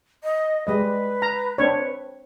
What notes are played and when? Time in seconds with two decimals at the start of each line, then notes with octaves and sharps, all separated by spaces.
0.23 D#5
0.67 G3 G#3 B4 D#5
1.22 A#5
1.58 C4 D4 C#5